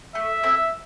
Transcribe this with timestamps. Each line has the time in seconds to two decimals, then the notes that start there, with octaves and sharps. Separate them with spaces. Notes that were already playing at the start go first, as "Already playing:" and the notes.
0.15 A3 E5
0.43 C4 E4 A4